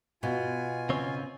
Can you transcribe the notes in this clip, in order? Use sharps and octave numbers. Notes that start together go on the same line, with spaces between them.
B2 F4 G#5
C#3 C4 C#5